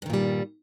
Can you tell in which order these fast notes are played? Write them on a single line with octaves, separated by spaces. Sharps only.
G2 D#3 A#2 G3